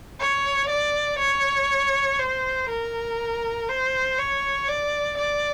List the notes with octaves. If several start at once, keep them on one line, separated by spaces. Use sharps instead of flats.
C#5
D5
C#5
C5
A#4
C5
C#5
D5
D5